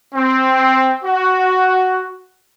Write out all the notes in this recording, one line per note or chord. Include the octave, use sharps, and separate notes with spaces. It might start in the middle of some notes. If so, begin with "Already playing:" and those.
C4
F#4